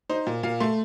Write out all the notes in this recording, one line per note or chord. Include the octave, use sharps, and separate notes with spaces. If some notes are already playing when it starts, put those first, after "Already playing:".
D#4 C5
A#2
A#2 F5
A3 C6